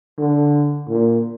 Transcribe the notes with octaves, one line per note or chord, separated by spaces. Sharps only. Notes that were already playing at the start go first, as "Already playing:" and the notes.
D3
A#2